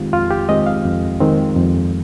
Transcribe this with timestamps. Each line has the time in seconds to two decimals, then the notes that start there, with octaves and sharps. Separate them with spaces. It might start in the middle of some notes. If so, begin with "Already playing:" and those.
Already playing: F2 D#3 G#3 C4 F4 G4
0.13 F2 F4
0.30 G4
0.49 D#3 G#3 C4 D#5
0.66 F5
0.85 F2
1.20 D#3 G#3 C4
1.56 F2